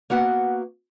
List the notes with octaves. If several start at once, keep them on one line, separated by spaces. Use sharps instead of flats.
A#3 B3 F#4 F#5